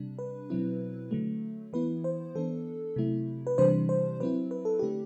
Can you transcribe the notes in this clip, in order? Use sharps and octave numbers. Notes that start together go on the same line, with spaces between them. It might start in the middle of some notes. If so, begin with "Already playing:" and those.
Already playing: C3 G3 D4
B4
B2 F#3 C4 E4
D3 F#3 A3
E3 B3 E4 B4
C5
E3 B3 D4 A4
C3 F#3 A3 E4
B4
C3 E3 G3 D4 C5
C5
F#3 C4 E4 B4
B4
A4
D3 A3 D4 G4